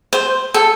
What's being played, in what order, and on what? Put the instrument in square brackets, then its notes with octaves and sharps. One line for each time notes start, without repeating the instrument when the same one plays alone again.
[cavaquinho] C5
A4